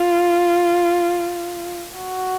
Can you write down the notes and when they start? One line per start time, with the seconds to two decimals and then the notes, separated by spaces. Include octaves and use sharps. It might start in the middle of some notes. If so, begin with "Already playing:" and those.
Already playing: F4
1.98 F#4